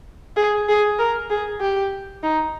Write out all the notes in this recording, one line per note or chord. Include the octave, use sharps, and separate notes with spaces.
G#4
G#4
A#4
G#4
G4
D#4